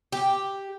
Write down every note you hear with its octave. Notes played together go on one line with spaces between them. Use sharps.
G4